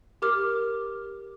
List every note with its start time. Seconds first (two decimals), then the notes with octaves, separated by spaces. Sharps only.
0.22 G4 A#4 D6 F6